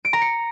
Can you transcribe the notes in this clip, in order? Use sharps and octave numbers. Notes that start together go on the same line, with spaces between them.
D7
A#5
C#7